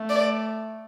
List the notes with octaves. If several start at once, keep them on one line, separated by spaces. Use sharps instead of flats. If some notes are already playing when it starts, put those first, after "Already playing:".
Already playing: A3
D5